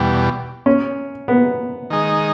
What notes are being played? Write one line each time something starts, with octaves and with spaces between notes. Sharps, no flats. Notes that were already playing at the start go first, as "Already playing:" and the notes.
Already playing: E2 B2 G3
C#4
B3
D#3 G#3 D#4